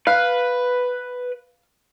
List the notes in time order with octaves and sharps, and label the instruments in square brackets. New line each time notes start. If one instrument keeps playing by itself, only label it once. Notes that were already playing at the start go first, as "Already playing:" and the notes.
[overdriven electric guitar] B4 [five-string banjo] F5